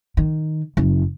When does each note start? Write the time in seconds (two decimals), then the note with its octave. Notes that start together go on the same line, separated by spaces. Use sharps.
0.17 D#3
0.77 F#1